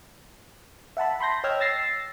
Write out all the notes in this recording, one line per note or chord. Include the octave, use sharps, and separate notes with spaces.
E5 F#5 A5 B5
A5 B5 C6 G6 A#6
C#5 D#5 G5 E6 F6 G#6
E6 A6 A#6 C7